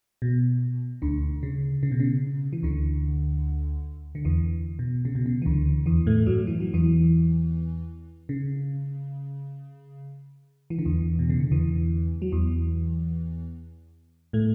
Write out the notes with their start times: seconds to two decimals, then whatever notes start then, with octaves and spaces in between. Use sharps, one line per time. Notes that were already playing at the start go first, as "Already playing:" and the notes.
0.22 B2
1.02 D2 D3
1.43 C#3
1.83 C#3
1.91 B2
2.00 C#3
2.53 E3
2.63 D2 D3
4.15 D3
4.25 E2 E3
4.79 B2
5.05 C#3
5.15 B2
5.26 C#3
5.42 E3
5.45 D2 D3
5.86 E2 E3
6.06 A2 A3
6.26 F#2 F#3
6.47 E3
6.60 F#3
6.73 E2 E3
8.29 C#3
10.70 E3
10.79 D3
10.85 E2 E3
11.19 B2
11.30 C#3
11.40 D3
11.51 E2 E3
12.22 F#3
12.32 E2 E3
14.33 A2 A3